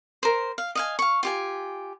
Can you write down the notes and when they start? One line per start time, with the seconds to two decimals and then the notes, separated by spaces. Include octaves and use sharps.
0.23 A#4 C5
0.58 F5
0.75 D#5 F5 G#5
0.99 F5 C#6
1.23 F4 G4 G#5